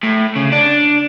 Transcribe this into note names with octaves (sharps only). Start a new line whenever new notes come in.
A2
C#3
D4